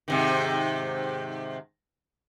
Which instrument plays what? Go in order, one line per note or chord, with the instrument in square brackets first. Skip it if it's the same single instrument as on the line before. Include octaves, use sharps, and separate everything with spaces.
[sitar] G#2 C3 D#3